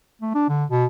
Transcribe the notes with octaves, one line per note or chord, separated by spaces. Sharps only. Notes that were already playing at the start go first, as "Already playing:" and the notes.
A3
D4
D3
B2